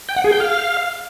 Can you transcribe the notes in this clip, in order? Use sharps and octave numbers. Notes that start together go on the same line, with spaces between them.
G5
F#5
G#4
G5
F5